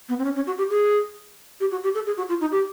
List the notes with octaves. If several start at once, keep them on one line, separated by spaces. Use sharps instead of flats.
B3
C4
C#4
C#4
F#4
G4
G#4
G4
F#4
G4
A4
G#4
F#4
F4
D#4
G4